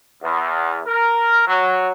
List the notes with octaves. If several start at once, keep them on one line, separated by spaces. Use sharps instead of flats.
E2
A#4
F#3